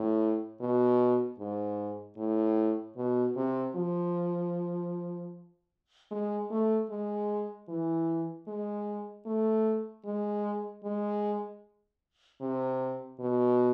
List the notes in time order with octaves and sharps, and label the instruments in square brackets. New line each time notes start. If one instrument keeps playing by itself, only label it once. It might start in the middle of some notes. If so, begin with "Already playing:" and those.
Already playing: [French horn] A2
B2
G#2
A2
B2
C3
F3
G#3
A3
G#3
E3
G#3
A3
G#3
G#3
C3
B2